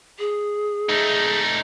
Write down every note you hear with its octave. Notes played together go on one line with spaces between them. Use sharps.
G#4
A3 D#4